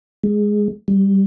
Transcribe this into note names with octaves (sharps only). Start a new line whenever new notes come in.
G#3
G3